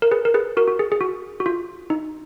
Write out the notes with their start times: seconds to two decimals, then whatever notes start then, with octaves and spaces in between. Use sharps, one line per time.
0.02 A#4
0.11 G#4 B4
0.25 A#4
0.34 G#4 B4
0.57 F#4 A#4
0.68 F#4
0.79 G#4
0.92 G#4
1.01 F#4
1.40 F#4
1.46 F4
1.90 D#4